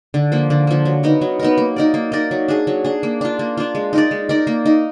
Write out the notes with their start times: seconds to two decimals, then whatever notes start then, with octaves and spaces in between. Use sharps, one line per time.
0.14 D3
0.32 F3 A#3
0.50 D3
0.67 F3 A#3
0.85 F#3
1.03 B3 D#4 A#4
1.21 F#3
1.39 B3 D#4 A#4
1.58 A#3
1.76 D#4 A#4 D5
1.94 A#3
2.12 D#4 A#4 D5
2.31 F#3
2.48 D4 G#4
2.67 F#3
2.84 D4 G#4
3.03 A#3
3.21 D4 F4
3.39 A#3
3.57 D4 F4
3.75 G#3
3.93 D#4 A#4 D5
4.11 G#3
4.29 D#4 A#4 D5
4.47 A#3
4.66 D#4 A#4